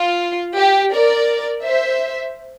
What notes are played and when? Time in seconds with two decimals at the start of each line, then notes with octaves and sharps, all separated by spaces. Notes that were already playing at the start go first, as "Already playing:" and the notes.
Already playing: F4
0.56 G4
0.92 A#4 D5
1.63 C5 E5